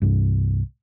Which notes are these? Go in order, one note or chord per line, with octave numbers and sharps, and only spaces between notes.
C2 G2